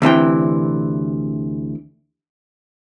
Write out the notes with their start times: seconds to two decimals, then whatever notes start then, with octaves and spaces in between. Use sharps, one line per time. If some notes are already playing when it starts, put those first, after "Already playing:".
0.02 D2 C3 E3 G5